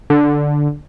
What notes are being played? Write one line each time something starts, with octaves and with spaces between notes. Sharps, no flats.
D3